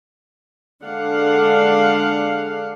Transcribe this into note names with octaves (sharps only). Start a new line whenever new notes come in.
D3 G#3 D4 F5 F#5